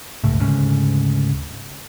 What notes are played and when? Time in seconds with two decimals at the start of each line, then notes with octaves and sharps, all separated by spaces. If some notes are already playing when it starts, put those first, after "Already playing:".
0.24 G1 C#2 A2
0.40 D2 G#2 C#3